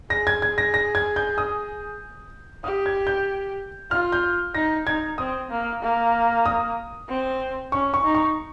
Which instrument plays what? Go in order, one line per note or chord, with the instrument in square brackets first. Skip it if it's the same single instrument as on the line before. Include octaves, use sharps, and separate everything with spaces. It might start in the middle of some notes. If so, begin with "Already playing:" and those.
[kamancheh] G#4 [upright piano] A#6
[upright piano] G#6
G#6
A#6
A#6
G#6
G6
D#6
[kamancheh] G4 [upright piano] D#6
[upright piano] G#6
G6
[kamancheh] F4 [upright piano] F6
[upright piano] G6
[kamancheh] D#4 [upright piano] A#6
[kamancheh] D#4 [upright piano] G#6
[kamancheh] C4 [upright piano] D#6
[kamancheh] A#3
A#3
[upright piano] D#6
[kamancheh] C4
[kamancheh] C#4 [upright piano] C#6
[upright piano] C#6
[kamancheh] D#4
[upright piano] C#6